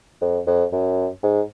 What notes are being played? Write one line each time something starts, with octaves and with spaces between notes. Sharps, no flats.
F2
F2
F#2
G#2